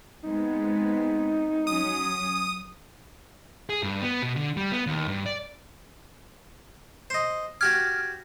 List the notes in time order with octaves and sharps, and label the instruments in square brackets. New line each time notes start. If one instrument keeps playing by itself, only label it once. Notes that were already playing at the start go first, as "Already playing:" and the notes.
[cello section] G#3 B3 C4 [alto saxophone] D#4
[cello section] F#3 C#4 [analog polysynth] D#6
[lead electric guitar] G#4
G2
B3
B2
D3
G3
B3
D#2
G2
D5
[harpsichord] C5 D#5
[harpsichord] F#4 G4 D6 [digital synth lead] F6 [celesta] G#6